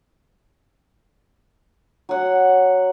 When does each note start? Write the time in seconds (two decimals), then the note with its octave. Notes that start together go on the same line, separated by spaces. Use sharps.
2.09 F#3 F#5